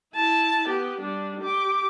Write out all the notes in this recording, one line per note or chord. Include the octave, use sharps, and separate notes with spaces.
E4 A5
B3 G4
G3 D4
G4 D6